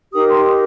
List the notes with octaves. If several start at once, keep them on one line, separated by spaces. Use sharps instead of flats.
D#4 G4 A#4 D#6
C6